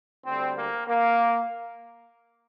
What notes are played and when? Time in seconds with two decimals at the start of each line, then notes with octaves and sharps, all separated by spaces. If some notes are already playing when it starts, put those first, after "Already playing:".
0.25 D2 D3 G3 C4
0.56 A#3
0.87 A#3